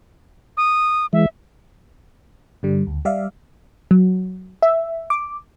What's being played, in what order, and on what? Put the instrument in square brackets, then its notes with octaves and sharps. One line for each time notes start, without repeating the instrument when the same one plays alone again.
[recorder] D#6
[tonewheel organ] E3 G#3 [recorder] E5
[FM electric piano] G2 D3 G3
D2
G3 D5 E5 F5
[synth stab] F#3
E5
D6